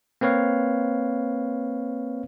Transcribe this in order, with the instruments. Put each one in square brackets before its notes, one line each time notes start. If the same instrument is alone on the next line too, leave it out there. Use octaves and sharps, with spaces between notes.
[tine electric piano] A#3 C4 B4 C#5 F5